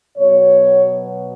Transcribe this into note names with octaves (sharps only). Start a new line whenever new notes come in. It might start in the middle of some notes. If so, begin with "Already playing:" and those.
B2 F#3 B3 C#5